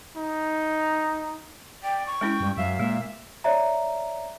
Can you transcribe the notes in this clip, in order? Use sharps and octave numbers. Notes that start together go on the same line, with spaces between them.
D#4
D5 G5
C#6
G#3 C#4 E4 G5
G2
F#2 E5 F5
A#2 G#3 E5
C#5 D5 E5 A#5